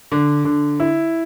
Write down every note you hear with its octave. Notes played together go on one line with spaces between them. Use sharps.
D3
D3
E4